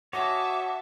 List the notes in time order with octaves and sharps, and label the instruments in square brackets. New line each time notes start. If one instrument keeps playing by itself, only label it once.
[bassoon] F#4 [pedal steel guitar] C#5 D#5 G#5 [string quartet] E5 A5 C#6 [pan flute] D6